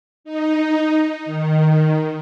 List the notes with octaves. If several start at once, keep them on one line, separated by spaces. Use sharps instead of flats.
D#4
D#3